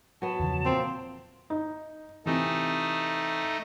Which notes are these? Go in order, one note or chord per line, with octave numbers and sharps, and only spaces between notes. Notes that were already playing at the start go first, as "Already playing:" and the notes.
F#3 B3 A5
E2 C#3 F3
A#2 A#3 C4
D#4
C3 E3 A3 D#4